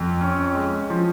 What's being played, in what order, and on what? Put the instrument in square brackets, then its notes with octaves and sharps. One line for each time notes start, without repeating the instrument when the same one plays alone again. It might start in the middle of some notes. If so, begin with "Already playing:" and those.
Already playing: [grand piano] F2
C#4
G#3
F3